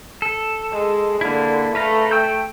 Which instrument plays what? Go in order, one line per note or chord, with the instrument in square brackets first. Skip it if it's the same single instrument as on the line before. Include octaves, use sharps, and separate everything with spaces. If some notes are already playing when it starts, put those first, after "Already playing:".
[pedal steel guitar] A4
[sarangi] G#3
[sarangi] D3 [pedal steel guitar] A#3 E4
[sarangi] A3 [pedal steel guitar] B4 F5 A#5
[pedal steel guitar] G5 E6 G6